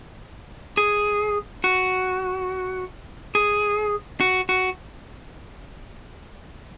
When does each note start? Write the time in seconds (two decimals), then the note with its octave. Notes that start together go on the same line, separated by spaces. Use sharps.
0.77 G#4
1.64 F#4
3.35 G#4
4.20 F#4
4.49 F#4